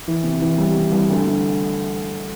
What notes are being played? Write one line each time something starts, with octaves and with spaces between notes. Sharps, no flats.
E3
C3
E3
G3
C3
C2
D2
D2